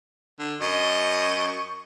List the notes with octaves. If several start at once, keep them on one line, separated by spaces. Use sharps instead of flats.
D3
F#2 D#5 C#6